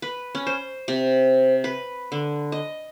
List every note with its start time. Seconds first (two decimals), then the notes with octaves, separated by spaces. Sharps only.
0.02 B4
0.35 C#4
0.47 C5
0.88 C3
1.64 B4
2.12 D3
2.52 D#5